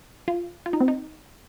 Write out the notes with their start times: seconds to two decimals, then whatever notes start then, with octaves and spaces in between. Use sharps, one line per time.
0.28 F4
0.66 F4
0.73 D#4
0.80 C4
0.88 D#4